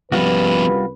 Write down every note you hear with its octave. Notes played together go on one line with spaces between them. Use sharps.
C2 F3 G3 B3 C#4 F4 F#4 B4